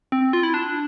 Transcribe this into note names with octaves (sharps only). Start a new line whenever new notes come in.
C4
F4
E4
D4